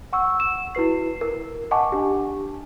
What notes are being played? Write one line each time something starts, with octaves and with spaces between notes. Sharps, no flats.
F#5 C#6 E6
E7
E4 F#4 B4 C7
A#4
D#5 F#5 G#5 A5 C#6 D6
D4 G4